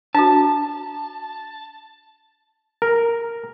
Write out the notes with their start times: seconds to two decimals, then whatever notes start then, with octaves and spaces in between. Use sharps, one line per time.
0.15 D4 F#4 A5
2.82 A#4